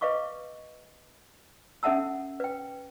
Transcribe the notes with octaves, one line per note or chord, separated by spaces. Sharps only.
B4 D#5 F5 C#6 D6
C#4 A4 E5 F#5 A5 E6
B4 G5